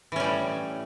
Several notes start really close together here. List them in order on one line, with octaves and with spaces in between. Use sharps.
E3 C#4 G3 A2